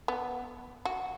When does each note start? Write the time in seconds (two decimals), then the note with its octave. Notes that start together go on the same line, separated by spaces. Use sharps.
0.08 B3
0.85 F#4